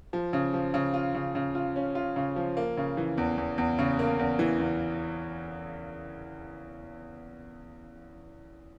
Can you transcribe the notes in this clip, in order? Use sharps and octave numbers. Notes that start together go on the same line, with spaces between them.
F3
C#3
F3
C#3
F4
C#3
C#3
F4
C#4
F4
C#3
F3
A#3
C#3
E3
E2
E2
E2
C#3
A#3
E2
E3
E2